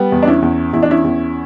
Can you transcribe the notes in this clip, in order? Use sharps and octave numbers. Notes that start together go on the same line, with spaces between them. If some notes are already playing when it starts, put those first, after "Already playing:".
Already playing: G3 B3
E2
D4
C#4 E4
E2
E2 E4
D4
C#4 E4
E2